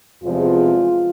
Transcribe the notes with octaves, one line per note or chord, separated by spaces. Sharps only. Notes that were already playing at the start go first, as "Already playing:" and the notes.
E2 C3 F3 G#3 F4